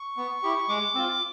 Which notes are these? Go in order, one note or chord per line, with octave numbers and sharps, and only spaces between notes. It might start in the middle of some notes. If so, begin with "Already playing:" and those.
Already playing: C#6
B3
E4 G4
G#3 D6
C4 F4